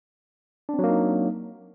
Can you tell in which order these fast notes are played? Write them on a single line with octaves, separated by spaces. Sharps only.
D4 C4 F#3 A#3 D#4